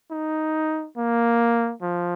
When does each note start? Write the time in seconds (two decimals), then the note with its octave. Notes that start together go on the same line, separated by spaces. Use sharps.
0.11 D#4
0.97 A#3
1.82 F3